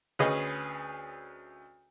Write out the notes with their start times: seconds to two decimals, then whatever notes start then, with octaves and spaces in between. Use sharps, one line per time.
0.19 D2 C#4 G#4 B4 D#5